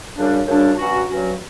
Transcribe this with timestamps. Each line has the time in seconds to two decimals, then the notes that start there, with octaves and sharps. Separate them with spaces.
0.16 F#2 C#3 G3 D4
0.46 F#2 C#3 G3 D4
0.77 G2 F#3 C#4 F#4
1.08 G2 F#3 C#4 F#4